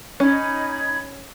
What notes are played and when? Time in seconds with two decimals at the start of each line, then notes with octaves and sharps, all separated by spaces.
0.20 C#4 D#4 B5 G#6